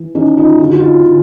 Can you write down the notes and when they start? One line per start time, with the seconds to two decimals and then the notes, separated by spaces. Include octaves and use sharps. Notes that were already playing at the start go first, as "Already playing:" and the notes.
Already playing: E3
0.15 E3 C#4 D#4
0.37 D#4 F4
0.59 D3 F4
0.70 F#4
0.80 D#4 F4
1.05 D3